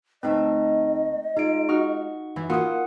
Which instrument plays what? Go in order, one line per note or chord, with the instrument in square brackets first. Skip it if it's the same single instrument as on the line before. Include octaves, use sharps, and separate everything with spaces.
[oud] D2 A3 B4 [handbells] C4 D#4 [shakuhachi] D#5
[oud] G#3 F4 [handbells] D#4 D7
[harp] D#4 F#4 F6 [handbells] C#6
[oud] F#2 [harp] E3
[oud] A#3 C#4 [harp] F4 F#4 [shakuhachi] A#4 [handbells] F#5 D#6